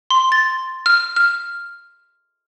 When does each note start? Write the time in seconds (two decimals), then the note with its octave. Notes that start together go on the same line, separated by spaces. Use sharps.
0.10 C6
0.32 A6
0.86 F6
1.16 F6